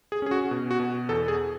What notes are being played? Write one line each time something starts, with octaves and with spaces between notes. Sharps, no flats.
G#4
C#4 G#4
F#4
B2
F#4
B2
E2 A4
G#4